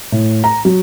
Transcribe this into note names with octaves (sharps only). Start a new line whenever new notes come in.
A2
A#5
F#3